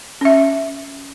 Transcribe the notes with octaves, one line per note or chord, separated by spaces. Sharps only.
C#4 E5